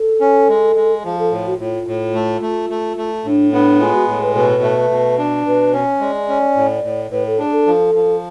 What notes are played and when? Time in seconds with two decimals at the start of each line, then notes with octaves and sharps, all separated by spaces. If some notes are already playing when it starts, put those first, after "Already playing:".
Already playing: A4
0.21 C#4
0.49 G#3
0.76 G#3
1.03 F3 G#4
1.18 A4
1.31 A2
1.46 F#4
1.59 A2 F4
1.87 A2
2.14 A3
2.42 A3
2.70 A3
2.97 A3
3.25 A2 D4
3.52 B3 D4
3.80 G#3 F4
3.94 F#4
4.08 A2 G#4
4.21 B4
4.35 B2 B4
4.62 A3
4.90 B2
5.18 D4
5.46 B2 B4
5.73 C#4 C#5
6.00 G#3 D5
6.29 C#4
6.56 A2
6.84 A2
7.11 A2 B4
7.25 A4
7.38 D4 G#4
7.52 A4
7.67 F3
7.95 F3